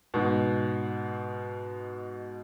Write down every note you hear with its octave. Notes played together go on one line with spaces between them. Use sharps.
G#2 B2